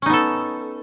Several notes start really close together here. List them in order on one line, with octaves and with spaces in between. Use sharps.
C#4 D#4 B3 A4